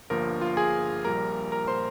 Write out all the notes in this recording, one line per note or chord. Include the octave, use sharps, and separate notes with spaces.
G1 G2 F3 A#3 A#4
F4 F5
G#4 G#5
A#1 A#2 G3 A#3 A#4 A#5
A#4 A#5
C5 C6